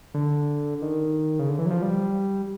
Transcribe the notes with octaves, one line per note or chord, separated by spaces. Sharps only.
D3
D#3
C#3
D3
E3
F#3
F3
G3